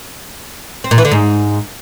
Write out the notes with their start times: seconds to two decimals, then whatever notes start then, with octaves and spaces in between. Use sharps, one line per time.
0.84 C4
0.91 A#2
0.98 E3
1.05 D3
1.12 G#2